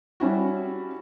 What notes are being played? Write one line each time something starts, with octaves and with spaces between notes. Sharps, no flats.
G3 C#4 E4 F#4